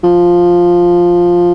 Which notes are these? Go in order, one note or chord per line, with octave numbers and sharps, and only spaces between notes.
F3